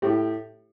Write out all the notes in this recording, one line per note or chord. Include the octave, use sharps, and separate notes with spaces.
A2 G4